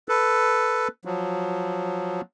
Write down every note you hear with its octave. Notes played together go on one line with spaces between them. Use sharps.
A4 B4
F3 F#3